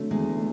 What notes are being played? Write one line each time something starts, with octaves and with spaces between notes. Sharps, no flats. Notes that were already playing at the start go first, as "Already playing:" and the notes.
Already playing: D3 F#3 A3
E2 G#3
A3